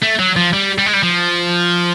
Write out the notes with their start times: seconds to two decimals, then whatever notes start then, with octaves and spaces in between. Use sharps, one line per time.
0.03 A3
0.20 F#3
0.37 F3
0.53 G3
0.78 G3
0.86 G#3
0.94 G3
1.03 F3